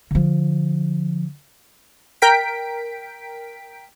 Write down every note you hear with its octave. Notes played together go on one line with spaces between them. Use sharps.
D3 F3
A#4 G5 B6 D7